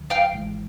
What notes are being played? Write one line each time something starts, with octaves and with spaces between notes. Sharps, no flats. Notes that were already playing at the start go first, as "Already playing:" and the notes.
Already playing: D2 D3 F#3
F5 G5
G#1 G#2 E3 G#3